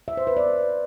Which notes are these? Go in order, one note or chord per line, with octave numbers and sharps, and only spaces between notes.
E5
C5
B4
D5